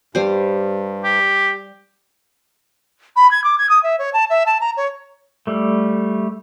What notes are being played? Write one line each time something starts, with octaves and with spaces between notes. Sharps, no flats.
G2 G3 C5
G4
B5
G#6
D6
G#6
D#6
E5
C#5
A5
E5
A5
A#5
C#5
G3 A3